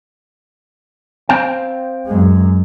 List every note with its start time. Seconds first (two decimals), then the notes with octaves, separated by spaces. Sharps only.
1.29 C4 F5 G5
2.06 F#2 G#3